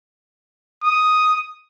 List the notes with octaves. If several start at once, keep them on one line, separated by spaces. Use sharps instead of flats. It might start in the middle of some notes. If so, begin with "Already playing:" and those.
D#6